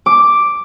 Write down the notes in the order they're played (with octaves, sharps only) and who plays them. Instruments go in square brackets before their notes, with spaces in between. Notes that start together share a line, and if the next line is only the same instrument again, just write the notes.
[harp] D6